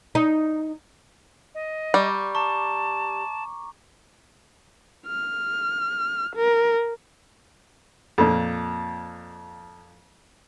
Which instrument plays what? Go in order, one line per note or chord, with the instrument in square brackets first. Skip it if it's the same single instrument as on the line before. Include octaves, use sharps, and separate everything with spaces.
[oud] D#4
[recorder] D#5
[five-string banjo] G3 [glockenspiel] A#5 C#6 D6
[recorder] A5 [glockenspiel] A#5 C#6
[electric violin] F6
A#4
[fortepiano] F2 A#2